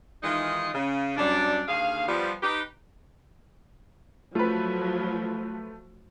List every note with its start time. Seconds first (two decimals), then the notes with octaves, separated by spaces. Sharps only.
0.23 D#3 E3 G#3 D#4 F4 D#5
0.73 C#3
1.17 F#2 F#3 G3 D4
1.68 D#2 D3 G#4 F5
2.07 F3 G3 B3
2.42 D#4 G4 B4
4.35 F3 F#3 A3 F4 B4